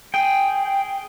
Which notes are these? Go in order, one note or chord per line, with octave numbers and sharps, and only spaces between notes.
G#4 G5